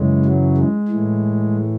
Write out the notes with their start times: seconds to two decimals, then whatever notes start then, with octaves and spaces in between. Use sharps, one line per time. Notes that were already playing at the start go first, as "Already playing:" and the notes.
Already playing: F#2 C#3 E3 G#3
0.25 F#3
0.57 G#3
0.88 A2 E3